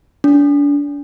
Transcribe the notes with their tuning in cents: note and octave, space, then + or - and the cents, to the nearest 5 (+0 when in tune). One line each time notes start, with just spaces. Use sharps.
D4 -35